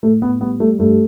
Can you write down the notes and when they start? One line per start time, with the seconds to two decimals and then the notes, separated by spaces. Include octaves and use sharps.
0.03 A2 A3
0.21 A2 B3
0.41 G3 B3
0.60 G3 A3
0.79 G2 A3